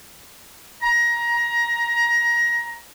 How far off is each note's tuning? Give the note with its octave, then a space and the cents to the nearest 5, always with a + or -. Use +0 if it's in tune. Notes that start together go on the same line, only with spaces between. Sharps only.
A#5 +20